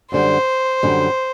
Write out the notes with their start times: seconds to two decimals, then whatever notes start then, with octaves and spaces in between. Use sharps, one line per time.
0.11 F#2 D3 G3 C5
0.83 F#2 D3 G3